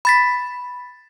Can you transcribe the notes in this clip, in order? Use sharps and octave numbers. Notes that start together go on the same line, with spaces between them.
B5 A6 B6